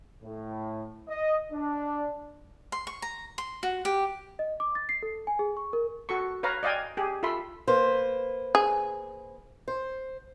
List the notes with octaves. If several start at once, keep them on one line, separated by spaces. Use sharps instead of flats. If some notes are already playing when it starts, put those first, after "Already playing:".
A2
D#5
D4
C6
C#6
A#5
C6
F#4
G4
D#5
D6
A6
C7
A4
G#5
G#4
C#6
A#4
F#4 A4 C#6
B4 C#5 F5 A#5
D5 D#5 F5 G5 G#5
G4 G#4
F4 A4 E5 B5 C6
A#3 B4 C5
G#4
C5